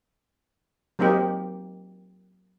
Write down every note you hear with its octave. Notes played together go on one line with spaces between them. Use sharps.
F#3 A#3 C4 D#4 G4